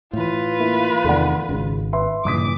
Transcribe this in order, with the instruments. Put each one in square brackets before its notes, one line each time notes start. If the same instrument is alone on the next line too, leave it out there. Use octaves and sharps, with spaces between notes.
[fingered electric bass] A2 E3 [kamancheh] F4 B4
[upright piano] A#3 E4
[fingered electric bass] E2 C3 D#3 [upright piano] A3 D5 F#5
[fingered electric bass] G#1 [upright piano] C#2
[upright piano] B4 E5 C6
[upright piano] F#1 D#6 B6 [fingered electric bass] G2 A#2 E3 [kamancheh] D6